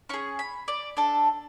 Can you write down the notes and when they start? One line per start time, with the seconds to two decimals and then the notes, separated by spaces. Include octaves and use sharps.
0.09 C#4 G#4 C#6
0.39 B5
0.68 D5
0.97 D4 A4